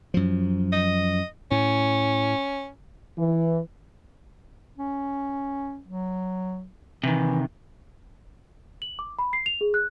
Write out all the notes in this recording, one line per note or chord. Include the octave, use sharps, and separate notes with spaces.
F#2 F3
D#5
A2 C#4
E3
C#4
F#3
C3 D#3 E3
F#7
D6
B5
C7
F7
G#4
F#6